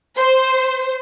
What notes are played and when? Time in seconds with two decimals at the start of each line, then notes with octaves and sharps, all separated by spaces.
0.17 C5